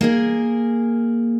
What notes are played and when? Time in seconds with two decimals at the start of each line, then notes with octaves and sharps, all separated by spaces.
0.01 A#3 G#4 A#4